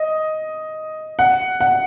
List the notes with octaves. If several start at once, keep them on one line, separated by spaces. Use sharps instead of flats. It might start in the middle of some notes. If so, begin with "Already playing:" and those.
Already playing: D#5
F#5
F#5